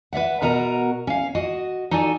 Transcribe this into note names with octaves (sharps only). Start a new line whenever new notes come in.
B4 D5 E5 F#5
B2 F#4 A#4 D#5 A#5
C#4 F5
F#4 D#5
D#4 F#4 A4 D5 G#5